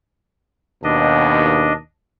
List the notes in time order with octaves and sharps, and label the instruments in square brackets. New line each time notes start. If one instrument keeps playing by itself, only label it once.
[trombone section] D#2 B2 [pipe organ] D4 D#5